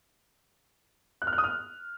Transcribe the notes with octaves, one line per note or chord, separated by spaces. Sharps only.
F#6
F6
F#6
D#6
F6